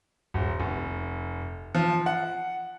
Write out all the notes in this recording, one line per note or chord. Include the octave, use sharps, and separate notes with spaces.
D#1
F1
F3
F#5